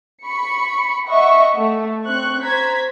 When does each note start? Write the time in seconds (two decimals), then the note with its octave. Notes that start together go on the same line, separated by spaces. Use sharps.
0.25 B5 C#6 C#7
1.08 D#5 E5 F#5 C#6
1.57 A3
2.05 C4 C#6 F#6
2.42 C5 A#5 G#6 B6